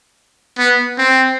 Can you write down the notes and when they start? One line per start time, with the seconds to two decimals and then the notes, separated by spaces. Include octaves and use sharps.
0.58 B3
0.98 C4